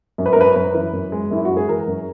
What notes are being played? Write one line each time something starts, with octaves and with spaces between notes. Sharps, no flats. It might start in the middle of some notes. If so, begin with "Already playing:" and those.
F#2
B4
A#4
F#2 B4
F#2 B4
E3
F#2
G#3
F#2 E4
F#4
G#3
G#4
E3 A#4
F#2